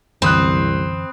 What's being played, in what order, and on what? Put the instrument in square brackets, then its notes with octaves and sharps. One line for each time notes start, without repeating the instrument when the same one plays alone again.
[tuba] C2 [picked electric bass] F#2 D3 E3 [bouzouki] C4 [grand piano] B5 D#6 F#6